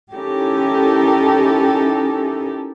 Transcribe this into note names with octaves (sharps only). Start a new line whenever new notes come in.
C#4 D#4 E4 G4 A4 A#4